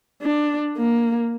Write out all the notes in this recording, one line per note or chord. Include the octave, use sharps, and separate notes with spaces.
D4
A#3